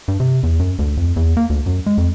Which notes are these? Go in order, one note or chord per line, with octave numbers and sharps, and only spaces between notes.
G2
C3
E2
F#2
D2
F2
E2
A#3
D2
F#2
G#3
F2